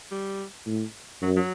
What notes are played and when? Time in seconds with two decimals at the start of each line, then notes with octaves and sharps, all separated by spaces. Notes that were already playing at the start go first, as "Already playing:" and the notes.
0.11 G3
0.66 A2
1.22 F#2 F#3
1.36 F#3